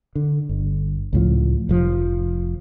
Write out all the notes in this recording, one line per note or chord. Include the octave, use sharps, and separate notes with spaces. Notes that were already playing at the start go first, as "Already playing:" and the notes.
D3
G1
C#2 A2 F3
F1 F3